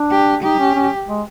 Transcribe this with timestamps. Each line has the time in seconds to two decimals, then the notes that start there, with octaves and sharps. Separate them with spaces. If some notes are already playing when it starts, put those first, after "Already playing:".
Already playing: D4
0.12 G4
0.43 D#4 G4
0.59 C#4
0.75 C#4
1.08 G#3